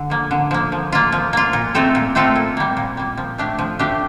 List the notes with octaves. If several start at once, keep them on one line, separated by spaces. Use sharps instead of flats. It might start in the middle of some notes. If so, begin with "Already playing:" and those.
Already playing: D3
F3 A#3
D3
F3 A#3
F3
A#3 F4
F3
A#3 F4
A#2
A3 C4 F4 A4
A#2
A3 C4 F4 A4
A#2
G3 A#3
A#2
G3 A#3
F3
A3 D4 G4
F3
A3 D4 G4